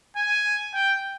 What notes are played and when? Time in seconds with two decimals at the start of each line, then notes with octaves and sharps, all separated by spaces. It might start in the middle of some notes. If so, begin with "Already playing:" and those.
0.16 G#5
0.74 G5